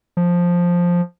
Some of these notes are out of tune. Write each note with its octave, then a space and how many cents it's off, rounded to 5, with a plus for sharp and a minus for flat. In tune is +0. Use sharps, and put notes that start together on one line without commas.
F3 +5